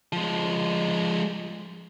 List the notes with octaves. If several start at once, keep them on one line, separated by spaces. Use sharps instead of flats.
F3 G#3